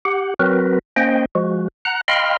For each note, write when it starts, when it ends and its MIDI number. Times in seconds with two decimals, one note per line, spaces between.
0.05 0.34 67
0.05 0.34 78
0.39 0.79 54
0.39 0.79 60
0.39 0.79 66
0.39 0.79 70
0.39 0.79 71
0.96 1.25 58
0.96 1.25 61
0.96 1.25 72
0.96 1.25 75
0.96 1.25 79
1.35 1.68 53
1.35 1.68 56
1.35 1.68 66
1.85 2.01 78
1.85 2.01 82
1.85 2.01 90
2.08 2.37 75
2.08 2.37 77
2.08 2.37 79
2.08 2.37 83
2.08 2.37 84
2.08 2.37 89